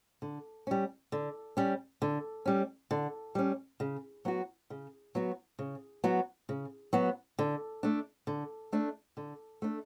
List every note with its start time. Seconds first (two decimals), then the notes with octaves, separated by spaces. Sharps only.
0.22 D3
0.67 G3 C#4
1.12 D3
1.57 G3 C#4
2.02 D3
2.45 G3 C#4
2.91 D3
3.35 G3 C#4
3.80 C#3
4.25 F#3 B3 F#4
4.70 C#3
5.15 F#3 B3 F#4
5.59 C#3
6.04 F#3 B3 F#4
6.49 C#3
6.93 F#3 B3 F#4
7.39 D3
7.83 A3 D4
8.27 D3
8.72 A3 D4
9.17 D3
9.62 A3 D4